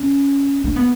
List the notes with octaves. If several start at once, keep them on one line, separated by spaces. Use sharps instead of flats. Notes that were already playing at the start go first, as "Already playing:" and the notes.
Already playing: C#4
D4
B3